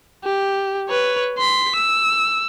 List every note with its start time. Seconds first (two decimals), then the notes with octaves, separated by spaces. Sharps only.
0.24 G4
0.89 B4 C#5
1.38 C6 B6
1.76 E6